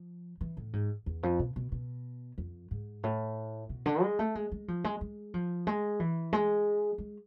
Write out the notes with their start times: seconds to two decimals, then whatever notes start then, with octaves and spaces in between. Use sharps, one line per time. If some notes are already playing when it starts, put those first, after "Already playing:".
Already playing: F3
0.41 E3
0.57 A2
0.73 G#2
1.06 E2
1.23 F2
1.39 B2
1.56 B2
1.72 B2
2.38 F2
2.71 G#2
3.03 A2
3.69 B2
3.86 D3
4.02 G#3
4.19 A3
4.35 G#3
4.52 G#3
4.68 F3
4.84 G#3
5.01 G#3
5.34 F3
5.67 G#3
6.00 E3
6.33 G#3
6.98 G#3